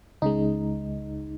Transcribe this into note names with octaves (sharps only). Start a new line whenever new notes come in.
C#2 C#3 G#3 D#4